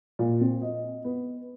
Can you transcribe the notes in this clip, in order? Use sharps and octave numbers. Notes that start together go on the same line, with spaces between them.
A#2
C4
D#5
B3